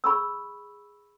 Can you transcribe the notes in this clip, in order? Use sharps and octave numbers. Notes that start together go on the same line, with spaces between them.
G#4 B5 C#6 E6